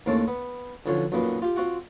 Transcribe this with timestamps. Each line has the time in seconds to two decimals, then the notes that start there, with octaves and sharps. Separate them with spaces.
0.06 D#2 A2 A#3 C4 C#4 A5
0.28 B3
0.86 B1 D3 F3 C#4 G#5
1.12 B1 F#2 A#2 A#3 B3
1.42 F4 G4
1.56 C4 F4 F#4 F#5